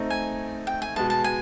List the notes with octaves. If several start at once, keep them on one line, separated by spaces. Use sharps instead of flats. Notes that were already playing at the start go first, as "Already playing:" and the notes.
Already playing: A3 C4 D#4
G#5
G5
G#5
B2 G#3 B3 A5
A5
G#5